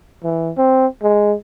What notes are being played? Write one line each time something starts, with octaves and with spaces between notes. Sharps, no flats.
E3
C4
G#3